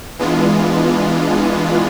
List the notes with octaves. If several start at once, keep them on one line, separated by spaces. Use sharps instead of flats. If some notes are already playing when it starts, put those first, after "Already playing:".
E3 G#3 B3 D4 F4